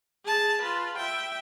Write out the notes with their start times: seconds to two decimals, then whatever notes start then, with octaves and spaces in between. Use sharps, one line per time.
0.25 G#4 A5
0.62 F4 B4
0.98 E5 G5